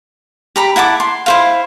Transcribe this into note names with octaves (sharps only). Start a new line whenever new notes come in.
G4 A#5 B5
E4 F#5 A5 D6
C6
E4 C5 F5